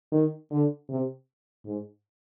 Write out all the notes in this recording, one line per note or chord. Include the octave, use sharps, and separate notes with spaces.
D#3
D3
C3
G#2